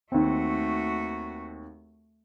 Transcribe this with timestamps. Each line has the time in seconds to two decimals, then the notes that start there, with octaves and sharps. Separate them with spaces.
0.12 D#2 A3 C4 F#4